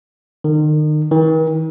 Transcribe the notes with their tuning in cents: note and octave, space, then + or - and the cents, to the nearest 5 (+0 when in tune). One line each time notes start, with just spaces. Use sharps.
D#3 -35
D#3 +45